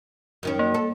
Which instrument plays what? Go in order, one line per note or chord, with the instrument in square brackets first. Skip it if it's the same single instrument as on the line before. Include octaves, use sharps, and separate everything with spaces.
[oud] F#2 D#3 C#4
[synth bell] A#3
[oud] A4